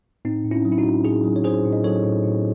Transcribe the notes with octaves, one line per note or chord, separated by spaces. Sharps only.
A2 C4 D#4
A2
C#4 E4
F#3
E4
D#4 F#4
A2
A2 E4 G#4
F#3
C#5
A2 G#4 C5
A2
D#5
F#3 A4 C#5
A2
A2